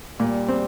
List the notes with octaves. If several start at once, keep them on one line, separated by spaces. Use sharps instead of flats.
A#2 G3
C4